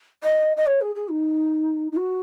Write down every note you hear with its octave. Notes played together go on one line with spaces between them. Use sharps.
D#5
D#5
C#5
G#4
G#4
D#4
D#4
F#4